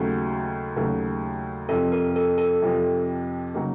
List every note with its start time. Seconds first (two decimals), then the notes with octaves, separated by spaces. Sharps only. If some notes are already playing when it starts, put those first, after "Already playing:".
Already playing: D#2 C#3 F#3 A3 F#4
0.76 D#2 C#3 F#3 A3
1.69 F2 C3 F3 A4
1.92 A#4
2.16 A4
2.38 A4
2.62 F2 C3 F3
3.54 C#3 F#3 A#3 D#4